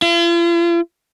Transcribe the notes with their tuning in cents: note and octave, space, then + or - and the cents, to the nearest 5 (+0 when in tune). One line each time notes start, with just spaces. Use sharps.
F4 -45